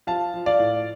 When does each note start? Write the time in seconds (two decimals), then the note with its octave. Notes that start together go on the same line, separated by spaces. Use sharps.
0.07 F3 F5 A5
0.34 F3
0.46 D5 F5
0.59 A2